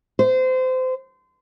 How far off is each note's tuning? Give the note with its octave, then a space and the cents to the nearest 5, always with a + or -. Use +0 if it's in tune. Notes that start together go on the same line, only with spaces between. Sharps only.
C5 -25